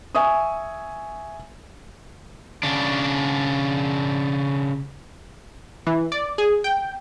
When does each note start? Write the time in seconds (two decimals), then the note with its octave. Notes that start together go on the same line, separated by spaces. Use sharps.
0.15 E5 G#5 C#6 D#6
2.63 C#3 D4
5.87 E3
6.12 D5
6.38 G#4
6.64 G5